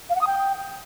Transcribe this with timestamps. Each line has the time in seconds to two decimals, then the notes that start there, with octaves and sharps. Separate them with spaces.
0.10 F5
0.15 F#5
0.21 D#6
0.27 G5